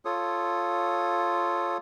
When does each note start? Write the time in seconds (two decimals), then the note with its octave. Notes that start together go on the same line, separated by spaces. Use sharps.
0.05 F4 A4 C#5 D#6